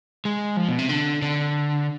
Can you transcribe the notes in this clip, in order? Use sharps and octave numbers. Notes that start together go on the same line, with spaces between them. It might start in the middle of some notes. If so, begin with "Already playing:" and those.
G#3
F3
B2
C3
D3
D3